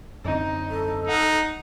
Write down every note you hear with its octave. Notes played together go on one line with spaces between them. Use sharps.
F#2 D3 C4 D#4
A4
D#4 F#5